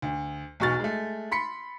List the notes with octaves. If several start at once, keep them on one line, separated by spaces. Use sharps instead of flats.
D2
B1 E2 F#4 C#6 F6 A6
G#3 A3
B5 C6 B6 C#7